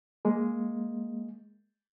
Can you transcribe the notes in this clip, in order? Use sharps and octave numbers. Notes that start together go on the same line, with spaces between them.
G#3 A#3